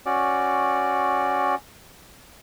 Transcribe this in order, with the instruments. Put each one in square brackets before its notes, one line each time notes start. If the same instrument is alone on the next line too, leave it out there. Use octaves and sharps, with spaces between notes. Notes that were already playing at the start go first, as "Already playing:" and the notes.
[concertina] C#4 F#4 D5